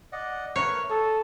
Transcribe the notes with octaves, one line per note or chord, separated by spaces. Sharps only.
D5 D#5 F#5
A3 A#4 B4 C#5
A4 A5 D#6